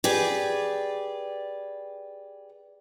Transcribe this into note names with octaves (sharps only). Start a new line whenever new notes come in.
G4 G#4 B4 D5